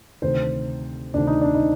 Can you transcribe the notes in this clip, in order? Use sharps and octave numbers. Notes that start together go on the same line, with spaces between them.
D2 C3 D#3 C5
D2 C3 D#3 D4
D#4
D4
D#4